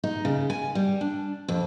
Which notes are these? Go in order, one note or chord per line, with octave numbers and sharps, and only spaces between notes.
D#4
C#3
G#5
G3
D4
F2